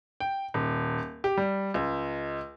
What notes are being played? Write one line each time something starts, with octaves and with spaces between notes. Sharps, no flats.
G5
D#1
G4
G3
C#2